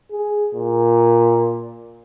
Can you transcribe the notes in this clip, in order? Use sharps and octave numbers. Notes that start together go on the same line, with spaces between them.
G#4
A#2